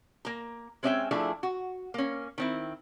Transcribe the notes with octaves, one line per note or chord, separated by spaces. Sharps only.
A#3 A#5
G#3 C4 C#4 D#5 E5 G5
F3 A3 D4 E4 G#4
F#4
A#3 C#4
D#3 C4 E4